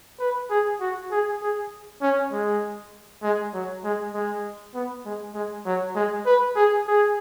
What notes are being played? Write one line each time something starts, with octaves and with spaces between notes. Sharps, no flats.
B4
G#4
F#4
G#4
G#4
C#4
G#3
G#3
F#3
G#3
G#3
B3
G#3
G#3
F#3
G#3
B4
G#4
G#4